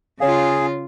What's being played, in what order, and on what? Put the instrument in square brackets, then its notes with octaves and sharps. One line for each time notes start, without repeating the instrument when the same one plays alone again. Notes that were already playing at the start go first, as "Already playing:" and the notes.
[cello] C#3 F4 [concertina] G#4 [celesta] C#5 F5